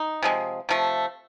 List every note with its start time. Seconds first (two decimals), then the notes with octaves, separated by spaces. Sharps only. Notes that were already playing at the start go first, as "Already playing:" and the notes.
Already playing: D#4
0.23 C3 F3 G#3
0.69 C3 F3 A3